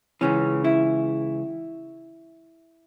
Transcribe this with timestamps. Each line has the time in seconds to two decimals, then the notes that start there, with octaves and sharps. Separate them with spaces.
0.21 C#2 C#3 E3 C#4
0.64 E4